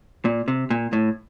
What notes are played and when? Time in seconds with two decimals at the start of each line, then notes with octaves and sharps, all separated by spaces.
0.25 A#2
0.48 C3
0.70 A#2
0.93 A2